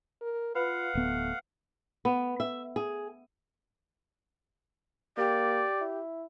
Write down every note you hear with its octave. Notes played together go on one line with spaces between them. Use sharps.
A#4
F4 B4 F5 F#5 B5
D1 A3 B3
B3
E5
G#4
A#3 G4 D5
E4